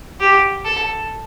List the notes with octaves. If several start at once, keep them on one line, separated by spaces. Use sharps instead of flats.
G4
A4